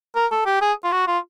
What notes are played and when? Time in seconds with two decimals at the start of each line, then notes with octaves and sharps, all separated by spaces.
0.15 A#4
0.31 A4
0.46 G4
0.61 G#4
0.84 F4
0.92 F#4
1.07 F4